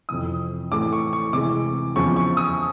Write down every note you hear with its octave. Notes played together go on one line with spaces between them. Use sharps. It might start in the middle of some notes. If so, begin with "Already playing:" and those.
F2 C3 E3 D#6
A2 E3 A3 D6
C#6
C#6
C3 E3 G#3 D6
E2 C#3 F3 C#6
C#6
D#6